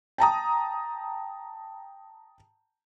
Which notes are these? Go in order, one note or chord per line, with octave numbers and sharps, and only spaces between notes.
G5 A5 A#5 D#6